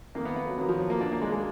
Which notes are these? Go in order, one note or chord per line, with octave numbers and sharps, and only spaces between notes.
F2 D#3 A#3
B3
B3
F#3
F2 D#3 F#3
F3
F#3
A#3
F#2 D#3 D4
A#3
G#3
G#3